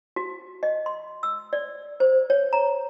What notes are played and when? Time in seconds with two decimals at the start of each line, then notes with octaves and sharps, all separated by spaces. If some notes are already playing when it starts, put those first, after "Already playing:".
0.16 F#4
0.63 D#5
0.86 C6
1.23 E6
1.53 D5
2.00 C5
2.30 C#5
2.53 A#5